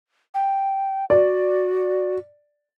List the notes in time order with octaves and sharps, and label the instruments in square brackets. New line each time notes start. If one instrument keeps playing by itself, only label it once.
[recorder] G5
[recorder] F#4 [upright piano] D5